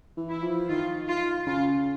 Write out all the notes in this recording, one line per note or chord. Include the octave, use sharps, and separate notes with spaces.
E3
E4
F3
D#3 F4
F4
C#3 F4